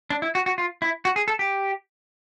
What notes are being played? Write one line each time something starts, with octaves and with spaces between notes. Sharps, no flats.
D4
E4
F#4
F#4
F4
E4
F#4
G#4
A4
G4